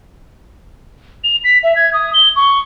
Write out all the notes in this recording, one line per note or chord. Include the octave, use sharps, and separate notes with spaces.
F7
B6
E5
G#6
D#6
G7
C#6